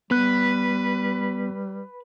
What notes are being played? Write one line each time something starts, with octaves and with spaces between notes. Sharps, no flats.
G3 B3 B4 F#6